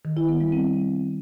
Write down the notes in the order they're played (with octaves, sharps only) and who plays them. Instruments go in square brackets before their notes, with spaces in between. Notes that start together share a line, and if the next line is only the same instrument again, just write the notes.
[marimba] D#3
E4
B3
G3
C4